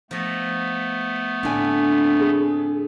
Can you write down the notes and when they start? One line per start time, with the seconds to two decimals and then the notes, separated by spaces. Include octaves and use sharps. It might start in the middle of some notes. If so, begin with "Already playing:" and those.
0.11 F3 A3 B3 D#5
1.43 A2 D3 C4 D4 G#5
2.20 G#4